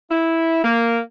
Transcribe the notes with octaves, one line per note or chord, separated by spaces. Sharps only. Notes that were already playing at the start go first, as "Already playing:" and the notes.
E4
A#3